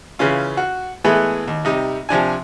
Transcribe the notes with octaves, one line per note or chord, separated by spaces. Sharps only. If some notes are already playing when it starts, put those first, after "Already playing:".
C#3 E3 C#4 F4
F#4
E3 G#3 A3 B3 G#4
D#2
C3 G3 D#4
C3 F3 D4 G#5